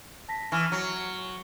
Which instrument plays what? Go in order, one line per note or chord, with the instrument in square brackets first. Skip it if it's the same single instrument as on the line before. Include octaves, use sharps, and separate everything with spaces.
[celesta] A5 A#6 B6
[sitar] E3 [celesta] G#5 C#6 F6
[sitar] F#3